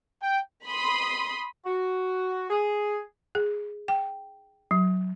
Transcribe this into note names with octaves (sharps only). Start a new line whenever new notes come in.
G5
B5 C6 D#6
F#4
G#4
G#4
G5
F#3